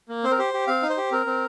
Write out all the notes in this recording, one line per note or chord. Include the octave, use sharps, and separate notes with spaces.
A#3
C4 C5
A#4
G4 C5
G4
C4 F5
D#4
C5
G4
C4 A#4
C4